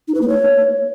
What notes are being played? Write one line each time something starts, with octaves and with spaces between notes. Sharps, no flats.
D#4
B4
A#3
C#5